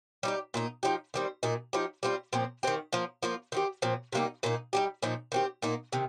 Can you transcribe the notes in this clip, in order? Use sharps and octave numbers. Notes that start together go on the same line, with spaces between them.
G3 D#4 G4
A#2 A#3 D#4
F3 D#4 G4
D#3 G3 C4
A#2 A#3 D#4
F3 D#4 G4
G3 C4 F4
A#2 F3 C4
D#3 C4 G4
F3 A#3 F4
F3 A#3 F4
D#3 C4 G4
A#2 F3 C4
C3 G3 A#3 D#4
A#2 A#3 D#4
G3 D#4 G4
A#2 F3 D#4
D#3 C4 G4
A#2 A#3 D#4
C3 D#3